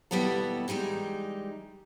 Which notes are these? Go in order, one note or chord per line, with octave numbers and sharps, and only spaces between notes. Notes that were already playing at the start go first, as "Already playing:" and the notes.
D#2 B2 G3 B3 E4 A4
E3 G3 G#3 D#4